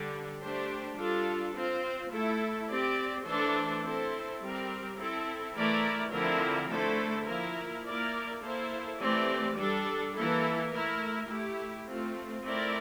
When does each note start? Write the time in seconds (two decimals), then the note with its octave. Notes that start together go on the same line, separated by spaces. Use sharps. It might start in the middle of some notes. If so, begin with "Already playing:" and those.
Already playing: D3 G3 D4
0.39 A3 D4 G4 C5
0.96 G3 D4 F4 A4
1.54 C4 F4 C5
2.10 A3 E4 A4
2.69 C4 G4 D5
3.25 E3 A3 D4 A4 C5
3.83 C4 E4 A4 C5
4.41 G3 C4 G4 A#4
4.98 C4 E4 A4
5.56 E3 A3 E4 A#4 D5
6.13 D3 F3 C4 E4 A#4
6.70 D3 A3 E4 A4 C5
7.27 F3 A#3 E4 A#4
7.84 A#3 E4 A#4 D5
8.42 A#3 E4 A4 C5
8.99 E3 A3 C4 G4 D5
9.57 G3 D4 A4
10.15 E3 A#3 E4 A4
10.71 A3 E4 A#4
11.28 A3 E4 G4
11.87 A3 C4 F4
12.43 A3 C4 E4 A#4 D5